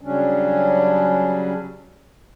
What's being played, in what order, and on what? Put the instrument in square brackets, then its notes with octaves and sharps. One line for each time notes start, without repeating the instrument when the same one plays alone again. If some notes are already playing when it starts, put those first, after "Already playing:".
[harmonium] C#3 F#3 G3 C#4 D4